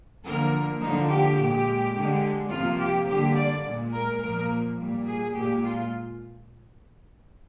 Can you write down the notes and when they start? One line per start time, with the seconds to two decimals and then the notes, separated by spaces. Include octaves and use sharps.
0.23 D3 F3 A#3 A#4
0.80 D3 F3 A#3 D#4
1.09 G4
1.37 A#2 G4
1.42 G#3
1.94 D3 G#3
2.51 C3 F3 A#3 F4
2.79 G4
3.07 D3 G3 A#3 G4
3.35 D5
3.64 A#2 G#3
3.93 A#4
4.20 A#2 F3 A#3 A#4
4.77 A#2 G3 A#3
5.06 G#4
5.34 A#2 G#3 G4
5.62 F4